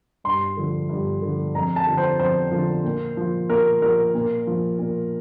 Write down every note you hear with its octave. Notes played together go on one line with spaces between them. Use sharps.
G2 C6
D3 F3
G2
D3 F3
F2 A#5
A5
D3 F3
C5
F2 C5
D3 F3
A#2
F3
A#2 A#4
F3 A#4
A#2
F3
A#2